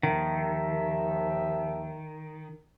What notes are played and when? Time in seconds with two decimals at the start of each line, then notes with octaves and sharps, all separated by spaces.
0.03 D#2 D#3 F3 E5